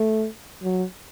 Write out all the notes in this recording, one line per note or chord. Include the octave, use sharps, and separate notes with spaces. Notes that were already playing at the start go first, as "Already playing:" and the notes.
Already playing: A3
F#3